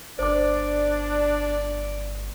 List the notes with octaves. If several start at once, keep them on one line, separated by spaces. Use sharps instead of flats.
G1 D4 C5 D5 D6